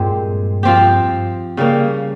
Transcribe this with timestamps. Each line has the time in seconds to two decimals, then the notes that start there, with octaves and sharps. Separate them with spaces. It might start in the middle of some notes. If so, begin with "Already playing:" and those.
Already playing: G2 A#2 G#3 C4 G4
0.63 F3 C4 G4
1.57 C#3 G3 A#3